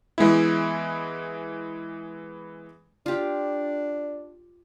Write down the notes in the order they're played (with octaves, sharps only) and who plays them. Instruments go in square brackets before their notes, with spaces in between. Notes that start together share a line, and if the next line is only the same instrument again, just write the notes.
[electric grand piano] E3 G#3 B3 E4
[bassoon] D4 [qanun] F4 G4